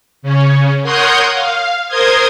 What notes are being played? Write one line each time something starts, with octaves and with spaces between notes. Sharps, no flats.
C#3 C#4
A#4 C#5 F#5 C6 D#6 G6
F5
A#4 C5 C6 D#6 G#6